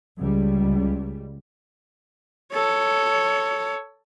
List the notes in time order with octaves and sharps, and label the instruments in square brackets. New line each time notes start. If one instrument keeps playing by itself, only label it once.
[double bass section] C#2 G3
[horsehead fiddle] A4 C#5